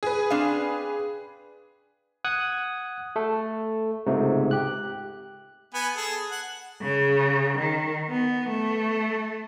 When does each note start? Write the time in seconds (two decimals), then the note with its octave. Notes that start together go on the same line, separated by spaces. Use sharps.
0.03 G#4 B4
0.30 C4 D4 F5
2.25 F#5 D#6 F#6 G#6
3.16 A3 A4
4.07 C#2 G#2 C3 A3
4.51 G4 F#6
5.74 B3 B4 G#5
5.96 G#4 A4
6.31 F#5
6.82 C#3
7.59 D#3
8.10 B3
8.50 A3